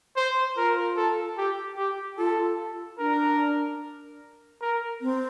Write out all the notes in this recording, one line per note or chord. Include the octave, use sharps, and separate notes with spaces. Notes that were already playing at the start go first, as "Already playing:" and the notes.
C5
F4 A#4
A4
G4
G4
F4 A4
D4 A#4
A#4
C4